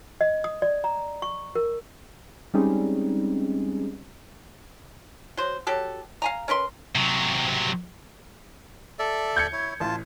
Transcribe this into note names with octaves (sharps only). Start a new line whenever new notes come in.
D#5
D#6
D5
A#5
C#6
A#4
G3 G#3 C4 C#4 D#4 G#4
F#3 C5
F#3 G4 A4
F5 G#5 A#5
C#4 A#4 B4 C6
C3 F#3
A4 D5 E5
G6 G#6 C#7
E4 C#5
A1 F4 A5